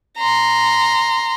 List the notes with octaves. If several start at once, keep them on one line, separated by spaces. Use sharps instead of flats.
A#5 C6